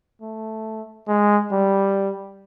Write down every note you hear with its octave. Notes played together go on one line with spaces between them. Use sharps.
A3
G#3
G3